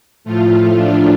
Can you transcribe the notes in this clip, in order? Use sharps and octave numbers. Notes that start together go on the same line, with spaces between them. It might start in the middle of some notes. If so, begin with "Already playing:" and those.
A2 F3 A3 F4
D4